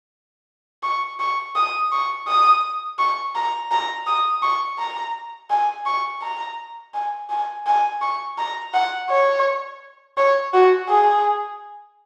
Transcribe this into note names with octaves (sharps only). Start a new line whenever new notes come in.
C#6
C#6
D#6
C#6
D#6
C#6
A#5
A#5
D#6
C#6
A#5
G#5
C#6
A#5
G#5
G#5
G#5
C#6
A#5
F#5
C#5
C#5
F#4
G#4